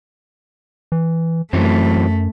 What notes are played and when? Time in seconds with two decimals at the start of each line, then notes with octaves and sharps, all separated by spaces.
0.92 E3
1.53 F#2 E3 F#3 A3 C4